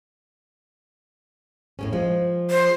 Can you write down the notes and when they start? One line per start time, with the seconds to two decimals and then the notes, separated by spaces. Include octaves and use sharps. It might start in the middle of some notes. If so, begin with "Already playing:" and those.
1.79 A2 C#3 C#4
1.93 F3 G#3
2.51 C5